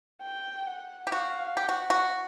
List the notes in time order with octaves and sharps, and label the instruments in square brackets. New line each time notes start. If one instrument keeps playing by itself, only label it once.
[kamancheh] G5
F#5
[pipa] G4
[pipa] F#4 [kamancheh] F5
[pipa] G4 [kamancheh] F#5
[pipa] F#4
F#4